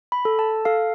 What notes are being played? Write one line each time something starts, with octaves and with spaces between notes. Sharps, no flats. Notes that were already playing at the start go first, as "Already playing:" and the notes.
B5
A4
A5
A4 F5